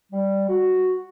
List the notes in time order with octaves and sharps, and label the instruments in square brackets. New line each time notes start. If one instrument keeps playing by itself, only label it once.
[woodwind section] G3
F#4